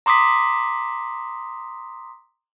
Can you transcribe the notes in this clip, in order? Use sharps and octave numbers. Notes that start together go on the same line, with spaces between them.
A#5 C6 D6 D#6 B6